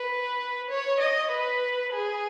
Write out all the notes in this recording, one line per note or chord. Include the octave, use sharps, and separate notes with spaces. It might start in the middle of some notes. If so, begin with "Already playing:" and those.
Already playing: B4
C#5
D#5
B4
G#4